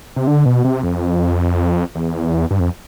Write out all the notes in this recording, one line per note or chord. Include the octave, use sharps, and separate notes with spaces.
C3
D3
B2
C3
F2
E2
G2
F2